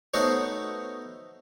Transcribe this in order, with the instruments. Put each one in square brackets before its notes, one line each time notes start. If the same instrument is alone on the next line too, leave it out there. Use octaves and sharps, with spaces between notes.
[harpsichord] A3 B3 D#4 F#4 C5 C#5